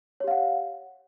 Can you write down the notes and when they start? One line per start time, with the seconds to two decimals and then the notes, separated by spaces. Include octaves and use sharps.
0.20 C#5
0.24 G4
0.28 F5
0.31 F#5